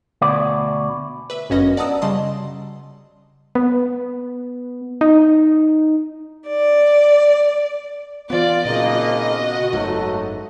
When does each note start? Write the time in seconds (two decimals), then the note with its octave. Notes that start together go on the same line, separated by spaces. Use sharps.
0.22 D2 B2 D5
1.30 B4 E5
1.50 G1 F#2 C#4 F#4 D#5 A#6
1.77 D5 F#5 A5 A#5 D#6 E6
2.02 C#3 G3 D#5 A5 C6
3.55 B3
5.01 D#4
6.48 D5
8.30 E3 B3 F4 D5
8.65 G#1 A#2 C#3 F#3 A#3 D#5
9.00 A#4
9.30 B3 F#4
9.72 F#1 G#2 F#3 A3